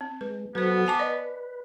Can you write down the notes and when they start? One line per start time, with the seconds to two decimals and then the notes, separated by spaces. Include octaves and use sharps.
0.01 C4
0.21 G#3 B4
0.55 F#3 B3 F#4 A4 B4 C5
0.87 G#5 A5 D6
0.99 B4 D5 D#5